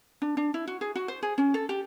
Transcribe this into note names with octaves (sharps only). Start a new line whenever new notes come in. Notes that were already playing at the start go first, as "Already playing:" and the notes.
D4
D4
E4
F#4
G#4
F#4
C5
G#4
C#4
A4
G4